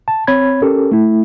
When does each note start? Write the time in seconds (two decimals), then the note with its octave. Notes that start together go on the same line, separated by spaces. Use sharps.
0.08 A5
0.27 C4 C#5 B5 G#6
0.62 C#4 G4 A4 A#4
0.91 A3 E4